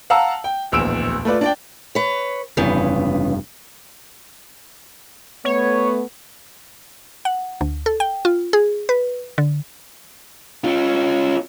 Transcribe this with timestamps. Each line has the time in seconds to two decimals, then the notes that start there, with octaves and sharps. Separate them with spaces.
0.10 F5 F#5 A5 A#5 E6
0.44 G5
0.72 D1 A#1 E2 E6 D7 E7
1.25 A3 F4 B4 D5
1.41 D4 D5 G5
1.95 B4 C#5
2.57 F1 G2 C#3 E3 B3
5.45 A3 B3 C#5
7.25 F#5
7.61 D2
7.86 A4
8.00 G5
8.25 F4
8.53 G#4
8.89 B4
9.38 D3
10.64 C#4 F4